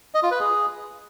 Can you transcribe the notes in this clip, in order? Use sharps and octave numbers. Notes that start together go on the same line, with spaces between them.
D#5
F4
B4
G#4